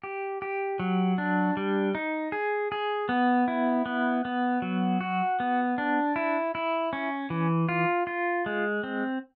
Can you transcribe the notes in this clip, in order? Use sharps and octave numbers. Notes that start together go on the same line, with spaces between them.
G4
G4
F#3
D4
G3
D#4
G#4
G#4
B3
E4
B3
B3
F#3
F#4
B3
D4
E4
E4
C#4
E3
F4
F4
G#3
C4